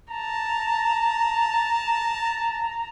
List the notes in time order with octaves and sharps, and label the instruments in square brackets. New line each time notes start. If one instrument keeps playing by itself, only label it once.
[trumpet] A5 [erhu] A#5